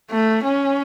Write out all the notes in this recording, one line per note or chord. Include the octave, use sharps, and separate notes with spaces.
A3
C#4